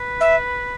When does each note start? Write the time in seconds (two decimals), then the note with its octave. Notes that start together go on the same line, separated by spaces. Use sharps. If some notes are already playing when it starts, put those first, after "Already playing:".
Already playing: B4
0.20 E5